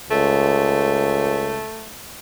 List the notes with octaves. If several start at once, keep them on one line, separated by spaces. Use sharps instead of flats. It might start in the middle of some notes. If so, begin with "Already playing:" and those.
C#2 A3